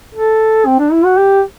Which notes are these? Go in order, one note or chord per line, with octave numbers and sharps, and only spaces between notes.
A4
C4
D4
E4
F#4
G4